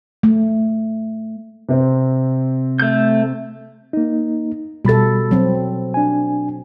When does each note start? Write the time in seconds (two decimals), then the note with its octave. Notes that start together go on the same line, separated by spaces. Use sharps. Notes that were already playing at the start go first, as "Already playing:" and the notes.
0.23 A3
1.69 C3 C4
2.80 A3 G6
3.93 A#3 D#4
4.85 B2 G3 A4 B5 A6
5.31 F#3 C4
5.94 D4 G#5